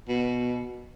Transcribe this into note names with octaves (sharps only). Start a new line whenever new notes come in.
B2